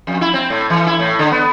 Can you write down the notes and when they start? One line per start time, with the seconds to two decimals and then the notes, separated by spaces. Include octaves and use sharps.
0.07 F2
0.21 E4
0.34 C4
0.50 A2
0.70 E3
0.86 E4
1.00 A2
1.19 D3
1.32 B3